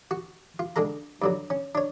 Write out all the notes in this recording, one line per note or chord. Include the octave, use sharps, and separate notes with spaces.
F#4
F4
D3 G#3 A4 A#5
G2 D3 F#3
C#4
D4 C#5